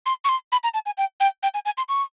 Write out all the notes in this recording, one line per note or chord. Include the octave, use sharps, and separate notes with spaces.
C6
C#6
C6
B5
A#5
A5
G#5
G5
G5
G5
G#5
G#5
C6
C#6